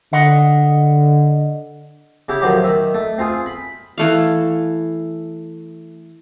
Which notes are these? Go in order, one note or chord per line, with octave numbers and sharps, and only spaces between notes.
D3 D#5 F#5
C#3 E4 G4
A2 D#3 F3 F#3 G4
D#3 E5
A3
C4 F4 G#4
B5
E3 A3 F5